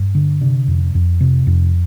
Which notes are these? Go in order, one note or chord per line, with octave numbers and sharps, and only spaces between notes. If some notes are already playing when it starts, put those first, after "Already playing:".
Already playing: G2
D3
C3 D4
F2
F2
C3
F2